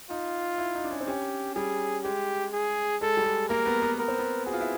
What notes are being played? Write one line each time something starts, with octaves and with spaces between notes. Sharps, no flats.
D#4 F4
E4
D#4
D4
C#4
C4
C#4 G4
G3 G#4
G#3 G4
G#4
G#3 A4
G3
G#3
A#3 A#4
B3
B3
B3 A#4
C4
B3
F#4 G#4
F4
E4